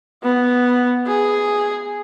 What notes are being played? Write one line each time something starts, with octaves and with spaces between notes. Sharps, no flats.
B3
G#4